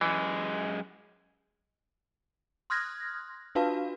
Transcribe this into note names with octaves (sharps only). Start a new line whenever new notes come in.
F#2 E3 G#3
C6 D#6 F6 F#6 G#6 A#6
D4 F4 F#4 B4 F5 A5